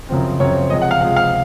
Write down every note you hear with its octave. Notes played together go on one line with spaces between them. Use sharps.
F#2 C#3 F3 C4
F#2 C#3 F3 C4 C#5
C3 F3 G#3 D#5
F#5
F5
C3 F3 G#3 F#5
F5